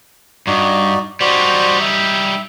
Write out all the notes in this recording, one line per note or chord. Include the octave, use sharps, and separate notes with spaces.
G2 D#4 F#4 D5
G3 D#4 F#4 C5 D5
E5